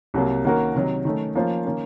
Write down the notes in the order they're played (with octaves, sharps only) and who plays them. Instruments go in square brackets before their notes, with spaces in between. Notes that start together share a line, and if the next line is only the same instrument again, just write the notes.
[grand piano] C2 C3 F#3 A#3
D#3 A#3 C#4 F#4 A#4
C3 D#3 F#3
D#3 A3 C#4
F3 A#3 C#4 F4 C5
D#3 A#3 C#4